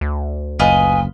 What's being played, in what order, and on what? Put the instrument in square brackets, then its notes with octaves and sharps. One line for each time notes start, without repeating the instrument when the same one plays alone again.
[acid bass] D2
[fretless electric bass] F#1 [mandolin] F4 B4 D#5 [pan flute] G#5